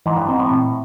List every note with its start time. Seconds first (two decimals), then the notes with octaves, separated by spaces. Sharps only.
0.06 G#2 E3
0.17 G2
0.29 G#2 C4
0.39 A2
0.51 A#2